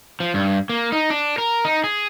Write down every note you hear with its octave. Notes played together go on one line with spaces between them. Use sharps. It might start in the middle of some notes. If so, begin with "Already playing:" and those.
F3
G2
A#3
D#4
D4
A#4
D#4
G#4